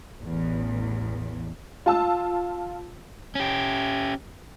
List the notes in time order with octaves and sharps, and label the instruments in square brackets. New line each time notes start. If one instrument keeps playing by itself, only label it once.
[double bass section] A1 [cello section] E2
[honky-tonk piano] F4 A5 E6
[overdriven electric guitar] C#4 G4